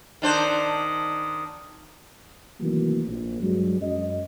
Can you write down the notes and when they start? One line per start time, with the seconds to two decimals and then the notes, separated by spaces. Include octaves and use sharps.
0.22 D#3 D4 C5
2.60 C3 D#3 E3 F#3 A3 A#3
3.06 A#1
3.41 G2 F#3 G#3
3.81 F#2 D#5